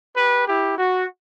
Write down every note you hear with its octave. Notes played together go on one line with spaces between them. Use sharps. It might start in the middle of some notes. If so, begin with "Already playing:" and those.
G4 B4
E4 G4
F#4